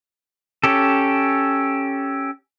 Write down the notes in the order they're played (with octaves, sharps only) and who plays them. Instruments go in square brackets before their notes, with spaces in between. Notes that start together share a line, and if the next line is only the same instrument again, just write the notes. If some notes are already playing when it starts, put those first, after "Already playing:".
[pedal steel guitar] C#4 G4 A4